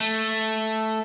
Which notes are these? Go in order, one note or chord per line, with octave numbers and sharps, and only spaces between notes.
A3